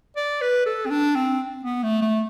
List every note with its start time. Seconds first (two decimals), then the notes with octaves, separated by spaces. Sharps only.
0.16 D5
0.41 B4
0.66 A4
0.86 C4
0.91 D4
1.15 C4
1.65 B3
1.83 A3
2.02 A3